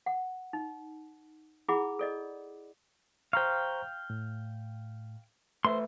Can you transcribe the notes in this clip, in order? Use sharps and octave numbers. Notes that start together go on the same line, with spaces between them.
F#5
D#4
E4 G#4 F#5 B5 D6
A4 D5 D#5
C5 F5 G5 A#5 C#6
A2
A3 B4 C5 E5 C6